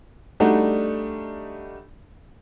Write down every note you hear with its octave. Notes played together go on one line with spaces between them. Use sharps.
G3 A3 D4 D#4 F#4